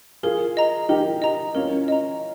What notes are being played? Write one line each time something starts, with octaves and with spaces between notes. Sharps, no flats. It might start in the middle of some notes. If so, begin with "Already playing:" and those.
F4 G#4 A#4
D#5 A#5
D#4 G4 A#4
D#5 A#5
C#4 F4 A#4
D#5 A#5